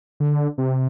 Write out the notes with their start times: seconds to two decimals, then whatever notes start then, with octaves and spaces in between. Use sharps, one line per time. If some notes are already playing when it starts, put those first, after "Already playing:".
0.20 D3
0.58 C3